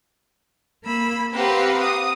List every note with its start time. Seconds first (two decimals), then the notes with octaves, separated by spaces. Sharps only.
0.85 A#3 B5 E6
1.34 C4 G4 B4 F5 F#5 A#5
1.80 D#6